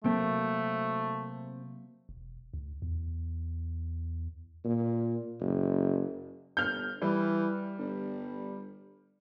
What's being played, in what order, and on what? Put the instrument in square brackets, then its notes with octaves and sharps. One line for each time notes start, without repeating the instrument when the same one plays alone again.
[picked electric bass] C3 C4 [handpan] F#3 A#3 [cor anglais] A3
[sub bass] E1
D2
E2
[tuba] A#2
F#1
[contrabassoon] G1 [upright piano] F6 G6
[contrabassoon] E3 [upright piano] G3
[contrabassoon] G1